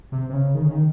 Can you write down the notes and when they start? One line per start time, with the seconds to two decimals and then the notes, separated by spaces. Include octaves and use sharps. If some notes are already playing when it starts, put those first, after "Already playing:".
0.12 C3
0.29 C3
0.33 C#3
0.55 D#3
0.63 C#3
0.71 D#3